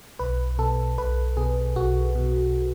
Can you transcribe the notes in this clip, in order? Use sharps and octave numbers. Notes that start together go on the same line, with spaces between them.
B1 B4
B2 A4
B1 B4
B2 G#4
B1 F#4
B2